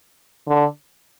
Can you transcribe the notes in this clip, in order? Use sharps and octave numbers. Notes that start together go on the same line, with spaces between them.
D3